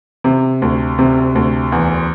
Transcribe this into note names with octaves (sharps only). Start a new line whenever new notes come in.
C3
D2
C3
D2
E2